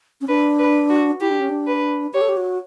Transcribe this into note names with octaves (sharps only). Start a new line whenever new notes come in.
C#4
D4 B4
B4
F#4
E4 G4
D4
C#4
D4
B4
G4 C#5
A4
G4
F#4